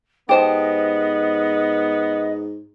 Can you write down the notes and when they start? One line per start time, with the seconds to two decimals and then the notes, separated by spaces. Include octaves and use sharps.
0.29 G#2 B3 G4 C5 D#5 A5